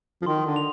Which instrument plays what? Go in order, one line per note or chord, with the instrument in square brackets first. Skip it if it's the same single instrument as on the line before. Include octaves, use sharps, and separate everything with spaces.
[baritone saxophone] F3
[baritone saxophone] D#3 [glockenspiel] C6
[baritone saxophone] D3
[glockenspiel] F7